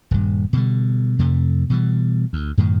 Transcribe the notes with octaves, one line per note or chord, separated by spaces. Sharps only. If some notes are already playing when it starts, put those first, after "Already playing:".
D#1 G2
B2 D3 G3
F2 C3 A3
B2 E3 G3
D2
F#2 A2 D#3